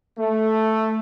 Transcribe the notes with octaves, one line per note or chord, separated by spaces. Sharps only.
A3